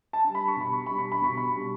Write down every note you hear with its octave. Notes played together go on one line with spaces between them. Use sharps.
A5
G3 D4
B5
C#6
B2 B5
C#6
G3 D4 B5
C#6
B5
B2 C#6
B5
G3 D4